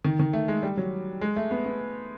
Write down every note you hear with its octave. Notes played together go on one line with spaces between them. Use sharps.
D#3
D#3
A3
G#3
G3
F#3
G#3
A3
B3
B3